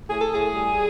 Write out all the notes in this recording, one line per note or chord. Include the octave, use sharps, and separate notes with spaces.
A2 G#4
A4
A2 G#4
G3